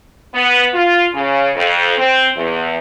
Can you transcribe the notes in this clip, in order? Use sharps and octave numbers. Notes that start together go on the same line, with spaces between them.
B3
F4
C#3
F2
C4
E2